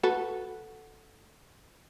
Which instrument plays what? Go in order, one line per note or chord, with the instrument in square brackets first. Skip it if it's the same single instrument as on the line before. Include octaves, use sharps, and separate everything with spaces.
[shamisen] F#4 A4 B4